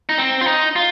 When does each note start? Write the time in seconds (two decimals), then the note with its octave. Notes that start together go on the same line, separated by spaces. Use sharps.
0.09 D#4
0.18 C4
0.41 F4
0.47 D#4
0.76 F4